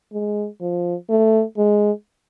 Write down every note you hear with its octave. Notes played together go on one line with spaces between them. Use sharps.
G#3
F3
A3
G#3